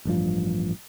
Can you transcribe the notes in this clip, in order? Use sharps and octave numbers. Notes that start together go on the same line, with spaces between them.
A1 G2 F3